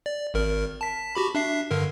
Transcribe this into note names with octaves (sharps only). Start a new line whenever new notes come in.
D5
G#1 A#4
A5 B6
F#4 G4 B5
D4 E5 C7
G2 D3 A#4